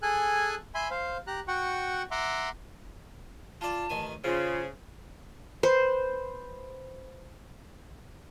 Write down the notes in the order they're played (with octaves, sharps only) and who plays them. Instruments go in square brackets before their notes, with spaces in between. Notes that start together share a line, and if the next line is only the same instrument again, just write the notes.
[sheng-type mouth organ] G#4 A4 G#5 F#6
E5 G#5 B5 C6
C5 F5
G4 A#5 F#6
F#4 F#5 G5 C#6
E5 F#5 A#5 C6 D6
[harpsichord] F4 D5 [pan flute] A5
[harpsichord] A1 D#3 G#5
[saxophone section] C#3 [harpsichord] C4 [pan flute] F4
[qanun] B4 C5